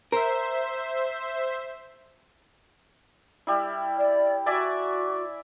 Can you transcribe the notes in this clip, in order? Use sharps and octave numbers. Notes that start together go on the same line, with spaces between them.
A#4 C5 E5
G3 E4
D5
F#4 D5 E5 G#5